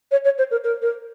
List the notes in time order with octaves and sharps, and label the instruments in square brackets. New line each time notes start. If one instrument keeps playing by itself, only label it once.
[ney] C#5
C#5
C5
A#4
A#4
A#4